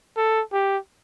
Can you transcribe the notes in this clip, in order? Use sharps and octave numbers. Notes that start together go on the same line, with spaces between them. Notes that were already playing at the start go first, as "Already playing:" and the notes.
A4
G4